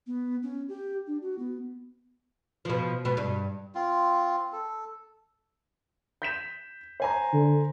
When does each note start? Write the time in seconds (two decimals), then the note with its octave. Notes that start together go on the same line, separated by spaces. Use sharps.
0.07 B3
0.43 C#4
0.69 G4
1.07 D4
1.22 F#4
1.39 B3
2.65 B2 F3
3.05 B2 B3
3.17 G2
3.75 C4 F4
4.53 A4
6.22 G6 B6 E7
7.00 C5 G#5 A#5
7.33 D3